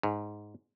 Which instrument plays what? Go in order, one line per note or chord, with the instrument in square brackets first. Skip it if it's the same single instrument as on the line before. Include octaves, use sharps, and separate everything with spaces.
[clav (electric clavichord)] G#2